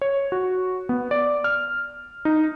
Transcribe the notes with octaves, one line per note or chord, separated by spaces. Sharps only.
C#5
F#4
B3
D5
F6
D#4